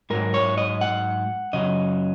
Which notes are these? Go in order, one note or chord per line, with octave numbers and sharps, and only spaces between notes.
G#2 F#3 A#4
C#5
D#5
F#5
F#2 C#3 F#3 D#5